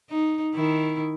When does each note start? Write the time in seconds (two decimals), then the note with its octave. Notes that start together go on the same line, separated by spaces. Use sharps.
0.10 D#4
0.55 D#3 E4